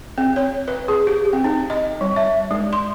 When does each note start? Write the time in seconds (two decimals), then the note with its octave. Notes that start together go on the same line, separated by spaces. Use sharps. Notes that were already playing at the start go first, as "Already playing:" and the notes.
0.18 C4
0.36 C#5
0.68 B4
0.88 G#4
1.07 G4
1.33 C4
1.44 D#4
1.70 D#5
2.01 G3
2.16 E5
2.51 G#3
2.73 C6